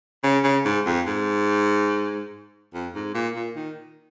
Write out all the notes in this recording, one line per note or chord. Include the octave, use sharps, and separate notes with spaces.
C#3
C#3
G#2
F2
G#2
F2
G#2
A#2
A#2
D#3